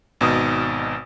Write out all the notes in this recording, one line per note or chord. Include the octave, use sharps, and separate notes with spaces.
G#1 B2 D#4 D#6